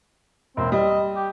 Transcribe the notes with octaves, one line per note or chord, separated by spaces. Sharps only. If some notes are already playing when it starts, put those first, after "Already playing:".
E1 A#3 C4
G3 D#5
G4